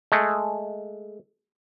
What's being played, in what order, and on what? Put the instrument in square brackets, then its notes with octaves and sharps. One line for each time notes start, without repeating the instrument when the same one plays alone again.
[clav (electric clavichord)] G#3 A3